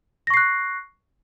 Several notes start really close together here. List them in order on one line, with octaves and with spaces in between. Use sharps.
A#6 C#6 C7 F#6